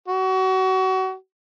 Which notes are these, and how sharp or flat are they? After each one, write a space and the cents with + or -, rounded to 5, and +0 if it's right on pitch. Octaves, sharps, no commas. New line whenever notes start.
F#4 +30